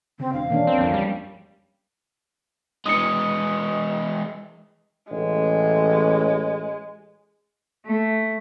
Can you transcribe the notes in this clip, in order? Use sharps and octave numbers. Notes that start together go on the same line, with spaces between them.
C#3 C4
E1 C4 D4 F5
B2 D#3 E3 A#3 C#4 D4
G1 C#2 F3 C4
F2
G3
E3 G#3 D#6 C#7
A1 G#3
A3